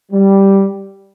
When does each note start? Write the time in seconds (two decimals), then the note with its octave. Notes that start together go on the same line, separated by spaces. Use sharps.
0.12 G3